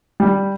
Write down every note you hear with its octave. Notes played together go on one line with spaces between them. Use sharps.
G3